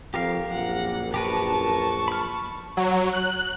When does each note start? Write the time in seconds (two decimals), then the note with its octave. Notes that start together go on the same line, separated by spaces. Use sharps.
0.14 F2 G4 A#4 F5
0.51 A#1 F#2 F#5
1.14 G4 A#4 B4 A5 C#6
2.08 B5 F6
2.77 F#3
3.13 F#6